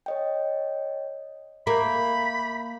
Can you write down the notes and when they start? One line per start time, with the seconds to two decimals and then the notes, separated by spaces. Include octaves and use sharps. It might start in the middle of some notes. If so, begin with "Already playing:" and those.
0.06 C#5 D#5 G5
1.67 A#3 E5 B5 G6